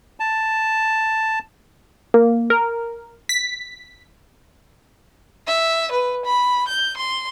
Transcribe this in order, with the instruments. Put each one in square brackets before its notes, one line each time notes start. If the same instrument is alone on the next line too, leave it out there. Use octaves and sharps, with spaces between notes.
[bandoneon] A5
[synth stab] A#3
A#4
B6
[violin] E5
B4
B5
G6
C6